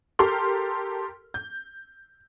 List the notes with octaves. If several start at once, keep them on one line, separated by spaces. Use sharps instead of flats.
G4 A4 A#4 C6 F6
G6